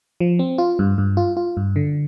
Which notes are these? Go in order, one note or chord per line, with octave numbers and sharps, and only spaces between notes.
F3
C4
F4
G2
G2
F4
F4
G2
D3